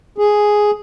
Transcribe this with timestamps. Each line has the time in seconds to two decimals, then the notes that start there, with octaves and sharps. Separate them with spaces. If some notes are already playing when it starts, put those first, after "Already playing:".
0.18 G#4